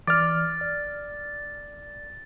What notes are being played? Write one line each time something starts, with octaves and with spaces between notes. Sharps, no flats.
E3 D5 D6 F6 A6
D5